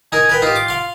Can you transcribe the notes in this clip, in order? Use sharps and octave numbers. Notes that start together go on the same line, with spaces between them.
D#4 A#4 G#5
A#4 B4 G5
D#4 F4 G4
D6
F5 C6